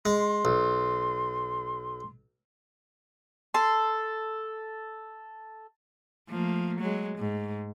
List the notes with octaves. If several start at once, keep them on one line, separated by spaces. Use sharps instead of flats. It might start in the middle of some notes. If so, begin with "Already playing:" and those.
G#3 C6
B1
A4 C6
F3 A3 A#3
F#3 G#3
G#2